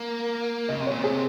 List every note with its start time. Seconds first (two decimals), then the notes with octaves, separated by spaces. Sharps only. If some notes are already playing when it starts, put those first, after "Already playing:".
Already playing: A#3
0.69 C#3 D#5
0.80 C3
0.87 C#5
0.91 A#2
1.01 C3 G#4